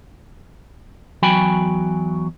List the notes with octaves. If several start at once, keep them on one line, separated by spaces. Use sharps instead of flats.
E2 F#3 F#4 G5 G#5 B5